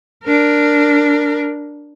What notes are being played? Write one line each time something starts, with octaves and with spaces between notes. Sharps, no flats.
D4 A#4